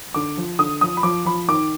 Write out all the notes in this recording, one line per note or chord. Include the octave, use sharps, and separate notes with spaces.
D3 D6
F3
D3 D#6
F3 D#6
B5
F3 D6
F3 B5
D#3 D6